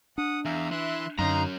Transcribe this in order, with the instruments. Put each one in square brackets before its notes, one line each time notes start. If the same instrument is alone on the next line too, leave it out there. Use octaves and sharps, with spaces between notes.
[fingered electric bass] D4 [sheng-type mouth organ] F#5 D#6
[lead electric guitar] E2 [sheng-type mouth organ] E5 F5 A#5
[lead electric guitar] E3 E4 [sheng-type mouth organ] E5 C6 F#6
[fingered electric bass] F#2 D3 [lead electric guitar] F#3 C#4 [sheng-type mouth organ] D#4 F5 C6 [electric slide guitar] A#5